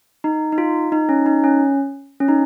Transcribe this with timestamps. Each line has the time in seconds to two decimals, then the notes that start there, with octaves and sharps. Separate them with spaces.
0.24 D#4
0.52 D#4
0.58 F4
0.92 D#4
1.09 C#4
1.26 D#4
1.44 C#4
2.20 C#4
2.28 D#4